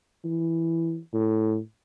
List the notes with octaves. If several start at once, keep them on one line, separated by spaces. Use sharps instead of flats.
E3
A2